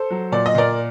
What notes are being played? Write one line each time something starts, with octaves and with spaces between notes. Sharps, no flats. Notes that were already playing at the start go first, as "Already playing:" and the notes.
Already playing: A4 C5
F#3
A#2 D5
D#5
A#2 A#4 D5